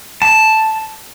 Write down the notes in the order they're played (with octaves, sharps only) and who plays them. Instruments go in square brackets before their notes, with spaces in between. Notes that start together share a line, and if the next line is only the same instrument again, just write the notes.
[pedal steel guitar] A5